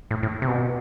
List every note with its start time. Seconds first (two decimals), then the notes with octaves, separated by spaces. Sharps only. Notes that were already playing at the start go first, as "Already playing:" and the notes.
0.11 A2
0.23 A2
0.42 C3
0.48 B2